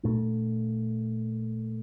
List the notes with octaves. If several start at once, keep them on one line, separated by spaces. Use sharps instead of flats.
A#2 A3 D4